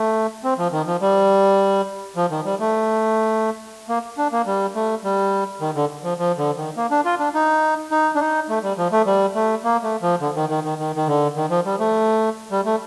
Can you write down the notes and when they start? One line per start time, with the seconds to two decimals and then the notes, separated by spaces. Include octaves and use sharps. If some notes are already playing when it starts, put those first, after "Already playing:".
Already playing: A3
0.44 C4
0.58 F3
0.72 D#3
0.87 F3
1.01 G3
2.16 F3
2.31 D#3
2.45 G3
2.60 A3
3.89 A#3
4.18 D4
4.32 A#3
4.46 G3
4.75 A3
5.04 G3
5.61 D#3
5.75 D3
6.04 F3
6.19 F3
6.38 D3
6.57 D#3
6.77 A#3
6.91 D4
7.05 F4
7.19 D4
7.34 D#4
7.91 D#4
8.15 D4
8.20 D#4
8.49 A3
8.63 G3
8.78 F3
8.92 A3
9.06 G3
9.35 A3
9.64 A#3
9.83 A3
10.02 F3
10.21 D3
10.35 D#3
10.50 D#3
10.64 D#3
10.79 D#3
10.96 D#3
11.08 D3
11.36 D#3
11.50 F3
11.65 G3
11.79 A3
12.51 G3
12.66 A3